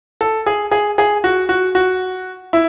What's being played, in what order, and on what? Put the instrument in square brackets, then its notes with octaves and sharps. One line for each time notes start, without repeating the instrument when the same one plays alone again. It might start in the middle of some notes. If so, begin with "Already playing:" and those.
[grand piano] A4
G#4
G#4
G#4
F#4
F#4
F#4
E4